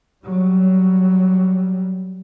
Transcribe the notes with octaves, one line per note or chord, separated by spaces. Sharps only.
F#3 G3